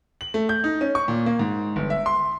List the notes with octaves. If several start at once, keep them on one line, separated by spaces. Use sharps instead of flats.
F#7
A3
G6
D#4
C#4
C#6
A#2
A#3
G#2
G1
E5
C6